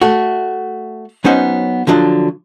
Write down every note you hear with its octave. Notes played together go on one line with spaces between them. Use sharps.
A3 F#4
F#3 B3 C#4 D#4 C5 F#5
D3 F3 F#3 D4